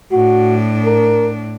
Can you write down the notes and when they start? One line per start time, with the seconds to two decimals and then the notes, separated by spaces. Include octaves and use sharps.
0.12 A2 D4 F#4
0.85 A#4